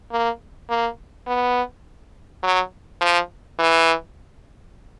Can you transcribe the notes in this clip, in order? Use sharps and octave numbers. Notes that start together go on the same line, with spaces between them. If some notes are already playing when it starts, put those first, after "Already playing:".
A#3
A#3
B3
F#3
F3
E3